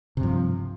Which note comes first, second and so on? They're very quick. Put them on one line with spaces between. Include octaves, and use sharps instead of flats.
C3 G2 F3